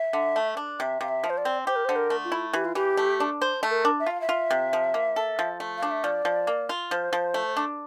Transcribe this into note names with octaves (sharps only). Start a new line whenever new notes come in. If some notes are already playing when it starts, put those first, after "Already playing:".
Already playing: E5
D3
A3
D4
C3 E5
C3 F5
E5
F3
C5
D5
C4
G4 C5
A#4
C5
D3
A#4
A3
F4
E4
E3 G4
F4
E3 G4
A3
D4
C5
A3
A#4
D4
E5
F4 F5
E5
F4
C3
F3
A#3
A4
F3
A3
D4 F5
E5
F3 D5
F3
A#3
F4
F3 C5
F3
A3
D4